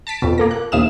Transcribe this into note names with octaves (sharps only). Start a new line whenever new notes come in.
A5 A6 B6 D7
F2 B2
A#3 A4 A#6
F#6
A#1 D#2 E5 F5 D#6 E7